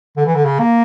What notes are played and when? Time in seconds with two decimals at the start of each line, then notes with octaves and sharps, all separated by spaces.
0.17 D3
0.26 E3
0.35 D3
0.45 C#3
0.59 A#3